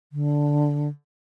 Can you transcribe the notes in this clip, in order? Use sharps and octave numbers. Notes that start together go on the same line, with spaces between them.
D3